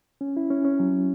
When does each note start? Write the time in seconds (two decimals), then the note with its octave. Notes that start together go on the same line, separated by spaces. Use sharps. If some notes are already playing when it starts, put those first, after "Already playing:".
0.21 C#4
0.37 E4
0.50 C#4
0.65 C#4
0.80 F#3